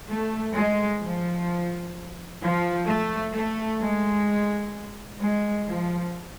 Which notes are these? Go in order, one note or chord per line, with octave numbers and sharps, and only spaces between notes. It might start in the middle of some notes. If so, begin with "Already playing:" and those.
A3
G#3
F3
F3
A3
A3
G#3
G#3
F3